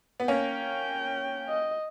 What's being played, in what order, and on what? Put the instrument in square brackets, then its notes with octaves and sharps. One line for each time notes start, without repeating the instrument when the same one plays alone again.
[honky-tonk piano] B3
[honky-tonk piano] A#3 C#4 [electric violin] G5
[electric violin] D#5